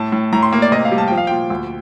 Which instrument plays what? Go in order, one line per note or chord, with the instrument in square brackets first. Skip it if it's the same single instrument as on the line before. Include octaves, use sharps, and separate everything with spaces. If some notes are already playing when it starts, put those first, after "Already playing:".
Already playing: [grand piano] A2 A5
A2
A2 A#5
C6
A#3
D5
C3 D#5
F5
G3
A5
F3 G5
F5
A#2 G5
D2